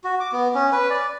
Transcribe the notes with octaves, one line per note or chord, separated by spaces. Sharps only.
F#4
D6
B3
C#4
B4
D5